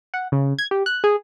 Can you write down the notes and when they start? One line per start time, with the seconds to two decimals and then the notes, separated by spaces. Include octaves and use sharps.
0.14 F#5
0.32 C#3
0.59 G#6
0.71 G4
0.86 F#6
1.04 G#4